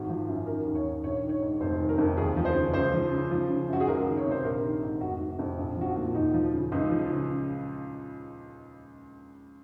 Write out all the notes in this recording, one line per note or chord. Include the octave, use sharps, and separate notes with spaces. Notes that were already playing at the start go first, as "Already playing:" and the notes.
Already playing: G#1 F#4
F3
F#2
D#3 A#4
D#2
C#5
D#3
A#1 C#5
D#3
C#5
G#2
F1 C5
D#3
A#4
F2
D#2 G#4
F3
C5
C#3
C#2 C5
F3
C#3
F3
C#3
F#2 F#4
G#4
C#2 A#4
D#3
C#5
C3
C5
A#1 A#4
D#3
G#2
F1 F#4
C3
F2
A#1
F3 F#4
F4
A#2
D#2 D#4
F3
F4
C#3
C#2 D#4
F3
C#3